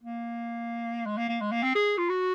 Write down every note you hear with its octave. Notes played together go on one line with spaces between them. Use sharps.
A#3
G#3
A#3
A#3
G#3
A#3
C4
G#4
F4
F#4